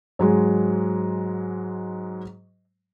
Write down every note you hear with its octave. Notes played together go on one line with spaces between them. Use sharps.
G#2 F#3 G#3